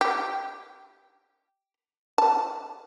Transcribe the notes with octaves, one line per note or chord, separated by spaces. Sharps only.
G4
A5